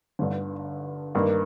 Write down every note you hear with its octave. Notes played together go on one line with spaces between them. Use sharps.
G1 G2 D3
G2 D#3 A#3